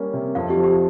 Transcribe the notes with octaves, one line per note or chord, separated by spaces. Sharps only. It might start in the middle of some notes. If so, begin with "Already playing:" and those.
Already playing: G3 A#3 C#4
C3
F2 F5
G4
F3
G4